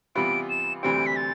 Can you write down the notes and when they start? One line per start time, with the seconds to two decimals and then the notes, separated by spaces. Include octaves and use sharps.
0.15 C3 E3 G3 B3 F4 D7
0.50 E7
0.83 D2 C3 E3 G3 C4 D7
1.06 B6
1.16 A6